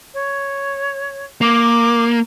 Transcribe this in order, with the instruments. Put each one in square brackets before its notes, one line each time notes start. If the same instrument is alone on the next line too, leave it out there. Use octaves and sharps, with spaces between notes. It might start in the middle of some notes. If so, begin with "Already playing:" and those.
[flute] C#5
[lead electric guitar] A#3 [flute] D6